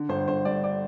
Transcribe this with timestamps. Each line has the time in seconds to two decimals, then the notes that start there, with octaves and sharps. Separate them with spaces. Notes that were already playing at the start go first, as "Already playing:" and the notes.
Already playing: D3
0.09 G1 C5
0.28 G1 C5
0.45 G2 D5
0.64 D5